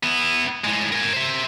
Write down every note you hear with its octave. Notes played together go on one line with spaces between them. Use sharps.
B3 E4
A2 G#3
A#4 G#5
C5 E5